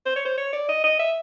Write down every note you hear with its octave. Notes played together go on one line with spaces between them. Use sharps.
C5
C#5
C5
C#5
D5
D#5
D#5
E5